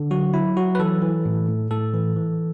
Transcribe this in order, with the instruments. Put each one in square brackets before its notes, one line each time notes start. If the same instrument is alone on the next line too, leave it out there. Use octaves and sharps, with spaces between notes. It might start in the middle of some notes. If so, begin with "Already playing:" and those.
Already playing: [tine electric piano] D3
F#3 F#4
F#3 E4
F#3 F#4
B4
E3 A4
E3
A2
A2
A2 A4
E3
E3